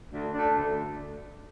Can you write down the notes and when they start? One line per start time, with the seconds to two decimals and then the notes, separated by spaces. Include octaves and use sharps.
0.12 D2
0.33 D3 A3 D4
0.55 D2